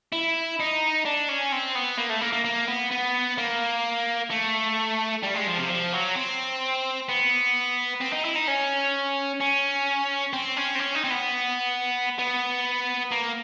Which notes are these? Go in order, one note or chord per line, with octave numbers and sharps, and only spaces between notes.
E4
D#4
D4
C#4
C4
B3
A#3
A3
A#3
A#3
A#3
B3
B3
A#3
A3
G3
G#3
F3
C3
F3
F#3
C4
B3
C4
D#4
E4
D#4
C#4
C#4
C4
C#4
C4
C#4
D#4
C4
B3
B3
A#3